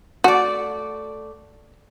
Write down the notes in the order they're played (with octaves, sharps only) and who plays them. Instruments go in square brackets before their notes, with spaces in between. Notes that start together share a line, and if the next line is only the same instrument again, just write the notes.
[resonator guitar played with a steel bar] A3 D5 [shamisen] F#4